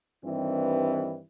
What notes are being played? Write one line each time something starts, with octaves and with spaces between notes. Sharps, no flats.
G2 D#3 E3 G3 C4